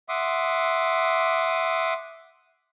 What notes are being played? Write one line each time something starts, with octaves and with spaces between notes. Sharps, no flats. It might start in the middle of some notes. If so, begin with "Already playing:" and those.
E5 F#5 C6 D6 D#6